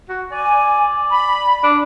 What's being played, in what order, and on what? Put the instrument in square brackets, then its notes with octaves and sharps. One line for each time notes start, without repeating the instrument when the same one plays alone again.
[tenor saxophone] F#4
[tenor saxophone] D5 [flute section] G#5
[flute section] B5
[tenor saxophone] D4